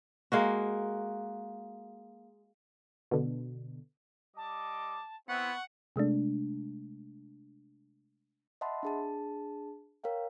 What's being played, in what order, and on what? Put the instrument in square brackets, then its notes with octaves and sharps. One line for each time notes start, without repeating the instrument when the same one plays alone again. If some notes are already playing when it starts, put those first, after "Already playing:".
[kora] G#3 A#3 F#4
[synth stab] B2 D3
[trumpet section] G3 D#5 D6 [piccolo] A5
[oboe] B3 [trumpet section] C4 E4 [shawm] F#5 [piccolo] C#6
[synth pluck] C3 G#3 A3 D4
[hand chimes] D#5 E5 F#5 A5 B5 C6
D4 G#4 A5
A#4 C#5 F5 G5